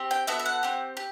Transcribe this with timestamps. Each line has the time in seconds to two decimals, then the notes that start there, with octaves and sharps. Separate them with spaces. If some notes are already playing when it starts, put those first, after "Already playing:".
Already playing: C4 G4
0.11 G5
0.27 B3 F#4 A4 E5
0.39 E5
0.46 F#5
0.63 C4 G4
0.97 G4